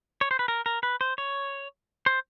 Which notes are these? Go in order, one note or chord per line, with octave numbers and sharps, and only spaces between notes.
C#5
C5
B4
A#4
A#4
B4
C5
C#5
C5